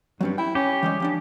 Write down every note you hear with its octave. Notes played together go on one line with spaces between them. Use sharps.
G2 F#3 C4 C#4
E4 G5
C#4 G4
E3 G3 G#3
F3 C#4 D4